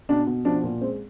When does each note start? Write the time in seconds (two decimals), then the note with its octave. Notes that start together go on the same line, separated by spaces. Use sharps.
0.09 B2 D4
0.27 B2
0.45 F3 D4
0.63 A#2
0.81 G#3 C4